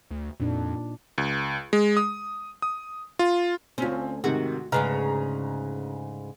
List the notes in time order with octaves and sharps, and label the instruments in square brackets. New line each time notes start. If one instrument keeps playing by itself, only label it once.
[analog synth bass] D2
[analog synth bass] F2 [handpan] A#2 D4 D#4
[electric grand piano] C#2
G#3
D#6
D#6
F4
[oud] D2 C#4 [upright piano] C4 F4
[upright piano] G#2 C3 D#3 [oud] F#4
[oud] D2 G#2 C#3 [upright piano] B4 A#5 F6